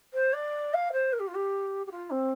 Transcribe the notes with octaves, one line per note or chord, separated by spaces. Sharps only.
C5
D5
F5
C5
A#4
G4
F4
G4
G4
F4
C4